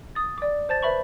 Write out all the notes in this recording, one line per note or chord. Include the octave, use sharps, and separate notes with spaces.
D#6 A6
D5 D6
C5 A5 A6
B4 C5 E5 B5 C#6